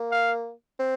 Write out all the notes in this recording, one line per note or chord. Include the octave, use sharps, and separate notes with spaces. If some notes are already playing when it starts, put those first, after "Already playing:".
Already playing: A#3
F5
C4